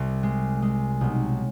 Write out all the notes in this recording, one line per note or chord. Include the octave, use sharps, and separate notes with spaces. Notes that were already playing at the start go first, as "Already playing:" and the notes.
Already playing: C2
G#3
G#3
B1